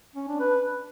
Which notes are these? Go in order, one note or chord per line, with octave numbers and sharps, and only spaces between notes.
C#4
D4
B4